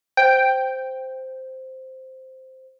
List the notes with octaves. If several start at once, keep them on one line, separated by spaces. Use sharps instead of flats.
C5 G5